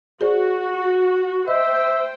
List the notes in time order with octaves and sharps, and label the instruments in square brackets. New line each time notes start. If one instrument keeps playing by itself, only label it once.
[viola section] F#4 [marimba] G#4 C5 D5
[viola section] C5 G5 [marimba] D#5 [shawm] E5